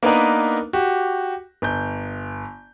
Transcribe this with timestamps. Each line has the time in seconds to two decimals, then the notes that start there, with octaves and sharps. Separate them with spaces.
0.03 A#3 B3 D4 D#4 A#4 B4
0.73 F#4 G4
1.62 G1 G6